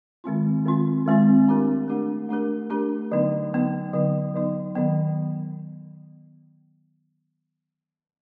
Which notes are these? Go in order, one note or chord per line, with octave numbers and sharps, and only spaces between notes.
D#3 G#3 C4 F4
D#3 G#3 C4 F4
D#3 G#3 C4 F4
A3 D4 G4 A#4
A3 D4 G4 A#4
A3 D4 G4 A#4
A3 D4 G4 A#4
D3 F#3 B3 D#4
D3 F#3 B3 D#4
D3 F#3 B3 D#4
D3 F#3 B3 D#4
D#3 F#3 B3